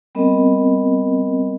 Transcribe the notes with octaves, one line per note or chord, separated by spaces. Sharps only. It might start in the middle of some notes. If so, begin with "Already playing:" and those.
G3 B3 C4 A#4 D#5